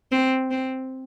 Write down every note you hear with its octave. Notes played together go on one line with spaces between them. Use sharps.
C4
C4